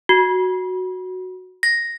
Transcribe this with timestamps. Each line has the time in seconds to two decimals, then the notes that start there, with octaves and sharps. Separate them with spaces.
0.09 F#4
1.63 A#6